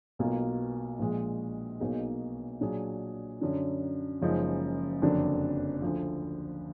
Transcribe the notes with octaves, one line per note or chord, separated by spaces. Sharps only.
B1 B2 A#3 F4
A#1 A#2 G#3
B1 B2 A#3 D#4 G#4
A#2 F#3 D4 G#4
F#2 D3 F#3 D4
F#1 F#2 F3 G#3 D#4
F#1 F2 D3 F#3 D4
D2 D3 F3